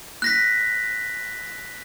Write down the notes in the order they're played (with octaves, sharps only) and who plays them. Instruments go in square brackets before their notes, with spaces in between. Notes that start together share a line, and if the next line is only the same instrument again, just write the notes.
[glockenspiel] F#6 A#6 B6